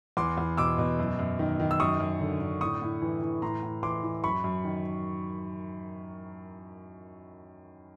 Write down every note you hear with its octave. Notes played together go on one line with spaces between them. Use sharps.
E2 C6 D6
E2
B2 D6 E6
B2
F#2
F#2
D#3
D#3
E6
F#2 C#6 D#6
F#2
D3
D3
A2 C#6 D#6
A2
E3
E3
A2 A#5 C6
A2
E3 C6 D6
E3
F#2 B5 C#6
F#2
D#3